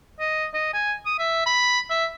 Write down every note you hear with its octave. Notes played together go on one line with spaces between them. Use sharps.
D#5
D#5
G#5
D#6
E5
B5
E5